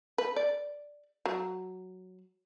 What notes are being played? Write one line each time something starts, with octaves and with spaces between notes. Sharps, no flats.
B4
D5
F#3